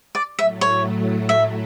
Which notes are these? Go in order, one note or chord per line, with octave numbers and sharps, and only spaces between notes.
D5
A2 F#3 A3 E5
C#5
E5